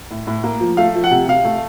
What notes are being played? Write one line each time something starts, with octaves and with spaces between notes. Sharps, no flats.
A2
A2
A#3
F3
A3 F5
F3
F#5
C3
C3 F5
A3